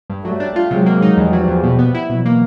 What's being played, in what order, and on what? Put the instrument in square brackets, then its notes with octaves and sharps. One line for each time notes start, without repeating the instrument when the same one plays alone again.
[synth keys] G2
[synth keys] F#3 [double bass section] G3 A3
[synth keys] D4
F4
[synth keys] C3 [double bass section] F#3 G#3
[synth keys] A#3
D#4
[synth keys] E2 [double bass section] F3 G3
[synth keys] F#3
E2
B2
B3
E4
[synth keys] B2 [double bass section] E3 F#3
[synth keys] A#3